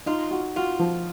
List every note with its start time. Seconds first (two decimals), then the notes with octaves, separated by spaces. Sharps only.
0.06 D#4 F4
0.31 F#4
0.56 F4 F#4
0.79 F3